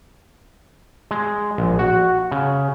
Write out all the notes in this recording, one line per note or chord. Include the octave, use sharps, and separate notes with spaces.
G#3
A#1
F#4
C#3